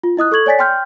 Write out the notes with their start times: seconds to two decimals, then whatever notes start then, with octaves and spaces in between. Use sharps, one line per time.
0.03 F4
0.17 E4 D#5 D#6 F#6
0.32 A4 C#6 G#6 F#7
0.46 C#5 D5 G#5 A6 B6
0.59 G5 C6 F6 G6